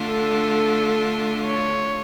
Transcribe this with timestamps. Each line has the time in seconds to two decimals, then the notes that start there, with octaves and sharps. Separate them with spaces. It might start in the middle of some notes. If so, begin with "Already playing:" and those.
Already playing: D3 A3 D4 F4
0.09 A4
1.46 C#5